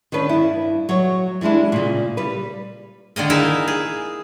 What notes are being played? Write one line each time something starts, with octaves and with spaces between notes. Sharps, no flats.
D#3 C#4 D4 B4
G2 E4
F#3 C#5
E3 G3 G#3 D4 E4
A#2 C#3
G3 B4
D3 D#3 A#3 D#5
D#4 E4 G#4 A#4 E5
G#4